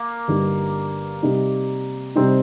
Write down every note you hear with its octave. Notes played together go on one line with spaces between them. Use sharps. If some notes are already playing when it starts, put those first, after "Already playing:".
Already playing: A#3
G1 G2 G3 D#4
C3 G3 D#4
C3 G3 C4 D#4